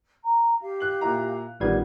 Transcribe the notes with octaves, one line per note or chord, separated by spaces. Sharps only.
A#5
G4 F5
F#6 F#7
A#2 E4 A#5
A1 D#3 G3 B3 F4 G#6